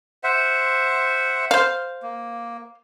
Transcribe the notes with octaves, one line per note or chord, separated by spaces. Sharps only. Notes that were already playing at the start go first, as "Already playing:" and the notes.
C5 E5 F#5
C5 F5
A#3